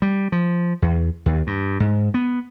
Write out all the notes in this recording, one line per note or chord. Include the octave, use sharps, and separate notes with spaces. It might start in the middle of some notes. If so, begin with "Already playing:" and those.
G3
F3
E2
D#2
G2
G#2
B3